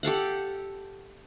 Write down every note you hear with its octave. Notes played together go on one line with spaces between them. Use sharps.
G4 A4 F5 F#5